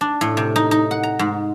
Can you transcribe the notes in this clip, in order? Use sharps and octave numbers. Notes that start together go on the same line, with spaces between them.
D4
A2
C3
D#4
D#4
F#5
A#5
G#2